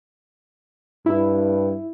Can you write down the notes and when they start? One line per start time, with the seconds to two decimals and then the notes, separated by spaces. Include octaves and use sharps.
1.06 G2 E4